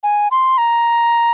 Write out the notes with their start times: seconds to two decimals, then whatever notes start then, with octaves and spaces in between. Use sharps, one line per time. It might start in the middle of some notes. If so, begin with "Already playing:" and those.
0.03 G#5
0.31 C6
0.58 A#5